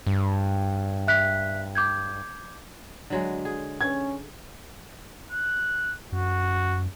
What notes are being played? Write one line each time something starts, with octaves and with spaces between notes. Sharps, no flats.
G2
E5 F#6 B6
D6 G6 G#6
D3 F#3 G#3
G#4
C#4 G#6
F#6
F#2 F#4